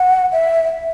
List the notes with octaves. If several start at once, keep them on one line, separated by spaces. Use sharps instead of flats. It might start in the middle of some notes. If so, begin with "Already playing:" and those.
Already playing: F#5
E5